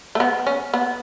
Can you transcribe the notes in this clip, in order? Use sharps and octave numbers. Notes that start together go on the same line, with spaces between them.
A3
B3
C#4
B3